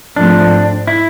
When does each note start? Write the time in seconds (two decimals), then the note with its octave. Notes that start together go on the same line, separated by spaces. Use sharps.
0.16 G#2 F3 A3 C4 D4
0.87 E4